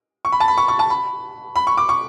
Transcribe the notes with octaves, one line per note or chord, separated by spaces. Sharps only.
C#6
B5
A5
B5
C#6
C#6
A5
B5
B5
C#6
D6
C#6